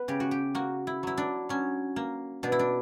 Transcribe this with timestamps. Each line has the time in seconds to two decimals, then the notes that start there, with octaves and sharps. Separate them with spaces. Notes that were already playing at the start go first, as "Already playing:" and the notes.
Already playing: B3 B4
0.08 C#3 G4
0.20 F#4
0.31 G4
0.55 A#3 F#4
0.87 E4
1.03 F#3 E4
1.18 D4
1.49 F#3 C#4
1.96 A#3
2.43 B2 D4
2.52 E4
2.59 D4